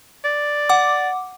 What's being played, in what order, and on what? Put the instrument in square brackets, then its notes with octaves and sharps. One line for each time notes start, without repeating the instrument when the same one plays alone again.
[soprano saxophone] D5
[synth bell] F#5 D6